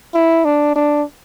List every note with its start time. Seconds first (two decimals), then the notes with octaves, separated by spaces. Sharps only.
0.14 E4
0.45 D4
0.76 D4